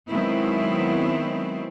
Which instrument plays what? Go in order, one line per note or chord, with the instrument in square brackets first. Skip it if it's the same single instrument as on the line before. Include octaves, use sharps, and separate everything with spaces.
[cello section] D#3 F#3 G#3 B3 C4 E4